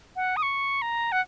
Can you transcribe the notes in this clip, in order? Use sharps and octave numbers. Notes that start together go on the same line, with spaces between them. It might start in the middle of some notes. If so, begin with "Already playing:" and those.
F#5
D#6
C#6
A#5
F#5